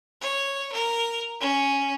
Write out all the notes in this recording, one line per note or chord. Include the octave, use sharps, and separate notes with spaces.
C#5
A#4
C#4